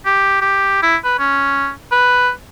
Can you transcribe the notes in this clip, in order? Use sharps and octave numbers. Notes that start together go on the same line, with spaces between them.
G4
G4
E4
B4
C#4
B4